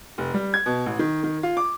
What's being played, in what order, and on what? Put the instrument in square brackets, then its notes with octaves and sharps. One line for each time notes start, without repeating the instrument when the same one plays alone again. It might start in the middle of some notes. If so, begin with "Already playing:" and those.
[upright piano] F1
G3
G#6
B2
A1
D#3
D#3
F4
D6